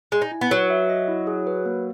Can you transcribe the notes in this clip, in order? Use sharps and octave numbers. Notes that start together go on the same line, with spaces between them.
G#3 G#5
D#4
E4
B3
F#3 B4
E5
D#5
E4
G#4
B4
A#3